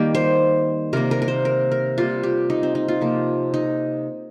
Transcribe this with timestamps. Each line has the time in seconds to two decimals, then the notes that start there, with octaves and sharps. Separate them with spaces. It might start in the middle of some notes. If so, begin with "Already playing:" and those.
Already playing: D#3 G3 A#3 G4
0.15 C5
0.93 C3 G3 A#3 A#4
1.11 A#4
1.22 A#4
1.28 C5
1.45 A#4
1.72 A#4
1.98 C3 G3 A#3 F4
2.23 G4
2.50 D#4
2.63 C4
2.75 D#4
2.88 F4
3.01 C3 F3 A#3
3.54 D#4